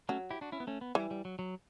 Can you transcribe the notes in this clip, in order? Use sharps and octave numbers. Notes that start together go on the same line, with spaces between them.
F#3 A3 C#4
E4 G4
D4 F#4
C#4 E4
B3
A3 C#4
B3
E3 G3
G3
F#3
F#3